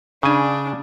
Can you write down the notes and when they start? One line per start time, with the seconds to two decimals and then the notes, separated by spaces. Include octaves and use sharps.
0.23 C#3 D4 G#5